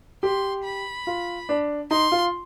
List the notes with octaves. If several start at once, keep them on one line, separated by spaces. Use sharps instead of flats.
G4 C6
B5
F4
D4
D#4 C6
F4